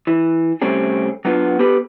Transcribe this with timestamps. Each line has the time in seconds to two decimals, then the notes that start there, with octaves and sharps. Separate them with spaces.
0.07 E3
0.62 C3 G3 A3 C4 C#4 G#4
1.25 F#3 B3 D4 F4
1.59 B3 G4 A4 B4